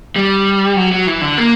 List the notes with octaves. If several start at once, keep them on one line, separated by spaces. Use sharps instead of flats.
G3
F#3
F#3
E3
D3
A#3